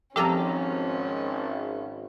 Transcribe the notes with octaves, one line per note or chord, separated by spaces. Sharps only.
G#1 F3 G3 C4 C#4 G4 A4 A#5